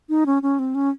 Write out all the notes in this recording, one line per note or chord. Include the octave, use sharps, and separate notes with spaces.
D#4
C#4
C#4
C4
C#4